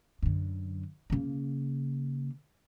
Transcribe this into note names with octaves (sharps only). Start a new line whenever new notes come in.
F#2 D3
C#3 A#3